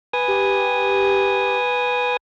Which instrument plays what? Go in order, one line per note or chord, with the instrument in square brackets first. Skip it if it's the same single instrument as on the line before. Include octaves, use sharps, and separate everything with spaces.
[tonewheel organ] B4 G#5 D#6
[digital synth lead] G4